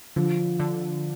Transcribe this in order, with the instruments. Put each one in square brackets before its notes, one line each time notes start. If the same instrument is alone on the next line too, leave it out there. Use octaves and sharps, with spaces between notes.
[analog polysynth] D3 [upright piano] F3
[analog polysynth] D3